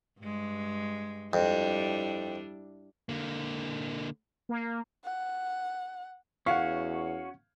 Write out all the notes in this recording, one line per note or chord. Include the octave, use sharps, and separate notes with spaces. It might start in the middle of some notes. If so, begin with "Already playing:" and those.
G2 G#3
F2 G3 D4 E4
D3 A#3
A#3
F#5
E2 C#4 F#4 C#5 F5 F#5 C#6